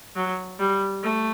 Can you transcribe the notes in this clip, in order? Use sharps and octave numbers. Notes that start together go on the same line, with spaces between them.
F#3
G3
A3